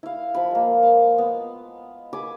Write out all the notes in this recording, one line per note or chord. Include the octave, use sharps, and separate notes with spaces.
E4 F5
F3 B5
G#3 A#3
F5
B3
G#5 B5 D6